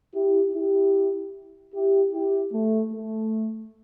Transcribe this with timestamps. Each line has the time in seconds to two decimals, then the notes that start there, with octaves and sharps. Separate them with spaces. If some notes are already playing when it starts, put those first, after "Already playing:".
0.14 E4 G4
0.54 E4 G4
1.73 E4 G4
2.12 E4 G4
2.53 A3
2.92 A3